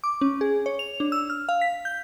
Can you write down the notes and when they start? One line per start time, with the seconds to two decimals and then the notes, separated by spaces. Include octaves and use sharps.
0.04 D6
0.21 C#4
0.41 G#4
0.66 C#5
0.79 F7
1.00 D4
1.12 E6
1.30 F6
1.49 F5
1.62 B6
1.85 G6